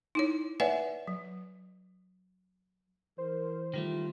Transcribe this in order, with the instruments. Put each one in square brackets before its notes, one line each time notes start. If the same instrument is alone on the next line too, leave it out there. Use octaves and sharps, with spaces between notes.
[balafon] D#4 E4 C#5
B4 C#5 D5 E5 F#5 G#5
F#3
[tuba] E3 [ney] A#4 [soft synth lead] C5
[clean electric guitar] D#3 G3 A3 [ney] F4